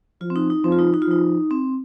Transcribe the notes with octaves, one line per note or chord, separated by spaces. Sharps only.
F3 F4
C4
D#4
D#4
F3 C4
F4
D#4
D#4
F4
F3 D#4
C4